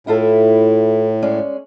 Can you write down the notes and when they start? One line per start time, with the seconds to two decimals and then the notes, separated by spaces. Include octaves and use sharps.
0.07 A2 E4 F4 A4
1.22 G#3 C#4 D5